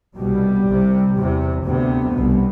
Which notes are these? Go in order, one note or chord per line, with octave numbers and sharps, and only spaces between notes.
C2 B2 G3
C2 C3
E2 C3
D2 C3 B3
C2 B2